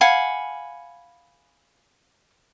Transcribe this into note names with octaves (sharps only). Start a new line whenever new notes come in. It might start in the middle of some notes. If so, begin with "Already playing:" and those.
F5 F#5 G#5 B5